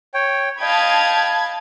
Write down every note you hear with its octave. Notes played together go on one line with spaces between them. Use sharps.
C#5 G5
D#5 F5 G5 A5 B5 G#6